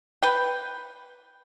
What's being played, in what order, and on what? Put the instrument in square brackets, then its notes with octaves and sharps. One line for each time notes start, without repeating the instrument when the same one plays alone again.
[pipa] B4 G5